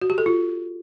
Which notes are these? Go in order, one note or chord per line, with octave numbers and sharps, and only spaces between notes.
F#4
G4
A4
F4